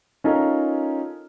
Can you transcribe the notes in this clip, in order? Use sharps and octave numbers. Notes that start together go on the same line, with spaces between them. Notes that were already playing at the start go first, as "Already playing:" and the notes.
C#4 D#4 F4 A4 A#4